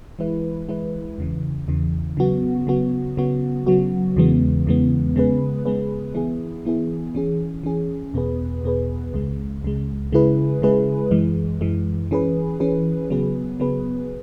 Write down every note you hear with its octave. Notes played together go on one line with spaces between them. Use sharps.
E3 G#3 E4 B4
E3 G#3 E4 B4
E2 C#3 E3
E2 C#3 E3
C#3 F#3 B3 F#4
C#3 F#3 B3 F#4
C#3 F#3 B3 F#4
C#3 F#3 B3 F#4
E2 C#3 E3 G#3 B3
E2 C#3 E3 G#3 B3
C#3 G#3 B3 G#4 B4
C#3 G#3 B3 G#4 B4
E3 B3 E4 G#4
E3 B3 E4 G#4
E3 C#4 G#4
E3 C#4 G#4
E2 B2 B3 G#4 B4
E2 B2 B3 G#4 B4
C#2 C#3 G#3
C#2 C#3 G#3
C#3 G#3 E4 G#4 B4
C#3 G#3 E4 G#4 B4
F#2 E3 G#3
F#2 E3 G#3
E3 C#4 G#4 B4
E3 C#4 G#4 B4
C#3 F#3 B3 G#4 B4
C#3 F#3 B3 G#4 B4